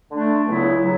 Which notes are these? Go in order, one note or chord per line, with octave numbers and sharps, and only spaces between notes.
D3 A3 D4
C#2 C#3 F#3 B3 E4
C#3 F#3